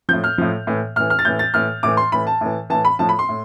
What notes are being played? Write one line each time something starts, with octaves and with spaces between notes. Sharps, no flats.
A2 F3 G6
F6
A2 F3
A2 E3
A2 E3 F6
F6
A6
A2 E3 G6
A6
A2 E3 F6
A2 E3 D6
C6
A2 E3 B5
A5
A2 E3
A2 E3 A5
B5
A2 F3 A5
B5
C6
A2